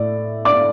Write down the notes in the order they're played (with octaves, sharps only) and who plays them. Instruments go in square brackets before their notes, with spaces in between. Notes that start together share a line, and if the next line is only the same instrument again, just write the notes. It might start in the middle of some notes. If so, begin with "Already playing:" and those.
Already playing: [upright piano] A2 A3 D5
D5 D6